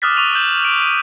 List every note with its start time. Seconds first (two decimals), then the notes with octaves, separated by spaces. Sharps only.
0.02 D6 D#6 F6 F#6 A6 B6
0.17 C#6 D#7 F7
0.35 G6 E7 F#7
0.65 D7
0.82 D#7